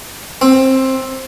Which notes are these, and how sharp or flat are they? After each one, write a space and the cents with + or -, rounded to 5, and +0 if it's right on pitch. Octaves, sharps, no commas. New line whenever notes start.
C4 +15